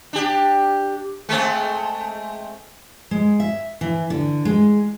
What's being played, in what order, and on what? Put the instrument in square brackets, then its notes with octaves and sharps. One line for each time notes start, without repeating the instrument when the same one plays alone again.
[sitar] D4 G4
G#3 A3 C4
[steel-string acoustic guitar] G#3
E5
E3
D3
G#3